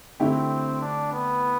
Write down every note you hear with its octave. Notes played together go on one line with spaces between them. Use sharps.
D3 A3 C4 E4 G4
D4
B3